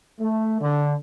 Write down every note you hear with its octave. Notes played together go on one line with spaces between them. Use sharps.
A3
D3